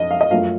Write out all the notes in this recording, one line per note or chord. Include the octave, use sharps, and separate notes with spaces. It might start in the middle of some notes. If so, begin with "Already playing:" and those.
Already playing: F2 D#5
F5
D#5
F#2 F3 A3 F5